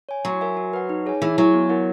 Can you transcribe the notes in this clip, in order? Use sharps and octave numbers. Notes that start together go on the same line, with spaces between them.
C#5 G#5
F#3 F#4
A#4 E5 G#5
F#4
B4 F#5
D#4
G#4 C#5 G#5
E3 G#4
F#3 C#5 G#5
B3
E4 A#4 C#5 F#5